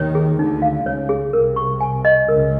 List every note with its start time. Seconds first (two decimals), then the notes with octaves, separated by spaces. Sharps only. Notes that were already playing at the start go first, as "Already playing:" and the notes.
Already playing: D#2 D#3 C#5
0.15 G#4
0.38 D2 D3 D#4
0.62 F5
0.85 C#2 C#3 C#5
1.09 G#4
1.33 C2 C3 A#4
1.56 C#6
1.81 G#5
2.05 D#5
2.28 C#2 C#3 A#4